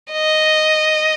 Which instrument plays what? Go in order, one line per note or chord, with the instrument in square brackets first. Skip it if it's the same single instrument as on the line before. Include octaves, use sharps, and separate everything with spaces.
[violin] D#5